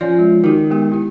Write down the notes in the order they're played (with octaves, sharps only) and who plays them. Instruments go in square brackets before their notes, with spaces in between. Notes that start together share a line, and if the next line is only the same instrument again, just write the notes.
[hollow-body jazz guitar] F3 [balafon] C#4 C#5 D5
[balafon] G#3
[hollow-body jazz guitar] D#3 [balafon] F#4 G4
[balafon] G#3 B3 G4
E4 G4